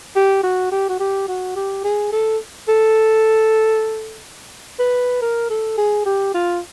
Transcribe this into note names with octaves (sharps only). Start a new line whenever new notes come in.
G4
F#4
G4
F#4
G4
F#4
G4
G#4
A4
A4
B4
A#4
A4
G#4
G4
F4